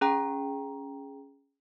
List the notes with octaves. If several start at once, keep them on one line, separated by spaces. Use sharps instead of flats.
C#4 G#4 G5 A#5